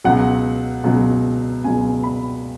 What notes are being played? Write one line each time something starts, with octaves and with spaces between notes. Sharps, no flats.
C#2 B2 F#3 F#5
C#2 B2 F#3
C#2 B2 F#3 G#5
B5